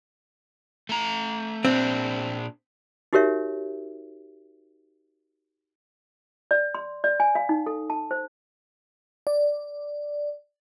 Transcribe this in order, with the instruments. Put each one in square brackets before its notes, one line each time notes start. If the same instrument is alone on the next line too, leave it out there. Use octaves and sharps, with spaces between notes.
[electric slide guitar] A3 A#5
[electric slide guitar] A#2 D4 E5 [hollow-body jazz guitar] C4
[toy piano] D#4 F#4 G4 A#4 C#5 E5
D5
C6
D5
G#5
F5
D#4
A4
A5
C5
[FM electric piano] D5